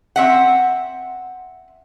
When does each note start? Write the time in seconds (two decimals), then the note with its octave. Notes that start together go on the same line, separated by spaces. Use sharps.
0.16 C4 E5 F#5